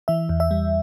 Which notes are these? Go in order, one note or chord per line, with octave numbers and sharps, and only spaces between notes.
E3 E5
E2
E5
G3